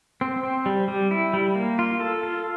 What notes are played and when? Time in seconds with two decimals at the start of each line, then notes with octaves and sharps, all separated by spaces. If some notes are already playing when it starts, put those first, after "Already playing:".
0.21 C4
0.43 C4
0.66 G3
0.88 G3
1.11 E4
1.33 G3
1.55 A#3
1.79 F4
2.00 A4
2.23 F4